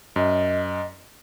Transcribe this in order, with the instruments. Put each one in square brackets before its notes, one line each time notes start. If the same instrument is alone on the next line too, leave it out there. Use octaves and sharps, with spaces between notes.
[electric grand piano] F#2 [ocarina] D#5